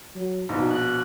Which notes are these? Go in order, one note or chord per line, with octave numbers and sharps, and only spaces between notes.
F#3
A#1 B2 D#4
F#6